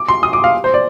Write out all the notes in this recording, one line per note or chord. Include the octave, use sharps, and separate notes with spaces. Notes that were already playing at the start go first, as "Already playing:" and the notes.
Already playing: D6
C6
D#6
D6
F5
C5
D5